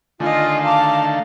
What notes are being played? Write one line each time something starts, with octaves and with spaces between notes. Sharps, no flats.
D3 D#3 A3 F4 D#5 G#5
F5 A5 A#5 D6